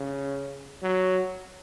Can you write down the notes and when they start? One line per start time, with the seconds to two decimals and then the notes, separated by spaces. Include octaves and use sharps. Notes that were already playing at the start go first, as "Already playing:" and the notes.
Already playing: C#3
0.83 F#3